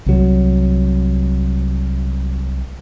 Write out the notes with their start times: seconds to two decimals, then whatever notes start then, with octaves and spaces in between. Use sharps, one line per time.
0.06 C2 F#3